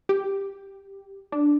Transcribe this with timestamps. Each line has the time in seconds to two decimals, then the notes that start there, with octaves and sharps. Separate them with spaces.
0.09 G4
1.32 D4